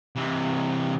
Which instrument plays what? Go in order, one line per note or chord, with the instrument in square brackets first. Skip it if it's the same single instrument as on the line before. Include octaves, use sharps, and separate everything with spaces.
[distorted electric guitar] C3 E3